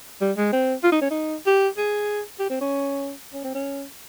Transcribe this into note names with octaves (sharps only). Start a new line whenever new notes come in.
G3
G#3
C4
F4
D#4
C#4
D#4
G4
G#4
G4
C4
C#4
C#4
C4
C#4